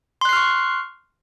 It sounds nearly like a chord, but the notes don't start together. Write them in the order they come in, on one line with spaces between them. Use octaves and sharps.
C6 F#6 C7 F6 C#6